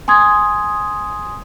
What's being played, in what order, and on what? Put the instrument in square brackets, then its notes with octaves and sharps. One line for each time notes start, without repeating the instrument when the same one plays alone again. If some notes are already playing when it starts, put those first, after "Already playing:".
[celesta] G#5 C6 D#6 G#6